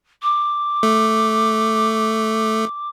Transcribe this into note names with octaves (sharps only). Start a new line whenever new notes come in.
D6
A3